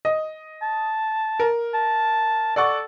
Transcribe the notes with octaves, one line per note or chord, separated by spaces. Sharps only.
D#5
A5
A#4
A5
A4 D5 F#5 C#6